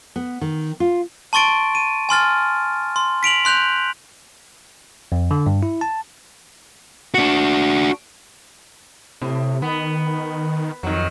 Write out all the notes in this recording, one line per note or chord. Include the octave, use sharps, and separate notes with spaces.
B3
D#3
F4
A5 C6 C#6 A6 D7
D#7
G#5 C6 F6 A6
C6
B6 D7 F7 F#7
C6 F#6 G6 F7
F2
D3
G2
E4
A5
D4 F#4
A2 C3
D#3 B3
F2 D#3 F#3